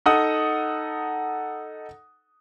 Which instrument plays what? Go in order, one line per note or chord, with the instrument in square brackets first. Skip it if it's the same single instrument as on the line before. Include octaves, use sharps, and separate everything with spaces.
[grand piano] D#4 A4 F#5 D#6